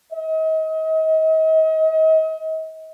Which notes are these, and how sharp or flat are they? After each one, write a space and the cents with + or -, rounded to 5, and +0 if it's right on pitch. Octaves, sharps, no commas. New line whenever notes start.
D#5 +35